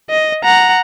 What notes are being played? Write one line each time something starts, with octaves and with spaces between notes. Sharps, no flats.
D#5
F#5 A#5